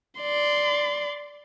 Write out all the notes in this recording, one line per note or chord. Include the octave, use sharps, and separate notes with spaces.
D5 C6